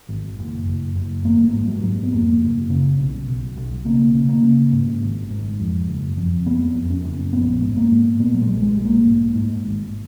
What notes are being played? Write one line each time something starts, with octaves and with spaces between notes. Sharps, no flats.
G#1
F#1
F#1
F#1
G#1 A#3
A#3
G#2 G#3
F#3
G#2
B3
F2 A#3
F#1
C#3
B1
B1
B1
C#3 A#3
C#3
A#3
C#3
G#2
G#1
G#2
F2
F#1
F2
F2 B3
F2
C#4
F#1
A#1 B3
G#2
A#3
G#2
A#2 B3
F#3
G#3
B1
G#3
B1
A#3
G#2
G#2
G#1